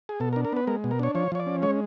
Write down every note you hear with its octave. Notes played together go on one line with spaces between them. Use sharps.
G#4
B2 A4
A#4
D4
A#4
B3 B4
G#3 A#4
B2
A#4
D4 C#5
F3 C#5
F3 C#5
D5
C#4
G#3 C#5